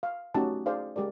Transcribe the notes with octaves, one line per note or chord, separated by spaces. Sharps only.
F5
A3 C#4 D#4 F#4 G4 A5
D#4 G#4 C5 D5 F5
G#3 G4 A#4 D5